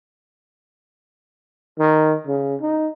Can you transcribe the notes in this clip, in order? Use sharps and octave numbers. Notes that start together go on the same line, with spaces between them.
D#3
C#3
D#4